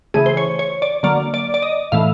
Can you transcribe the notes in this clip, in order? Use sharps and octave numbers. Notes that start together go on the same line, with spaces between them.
C#3 E3 A3 G#4
C5
C#5
C#5
D5
D3 F#3 A#3 D5
D5
D5
D#5
A2 E3 A3 F5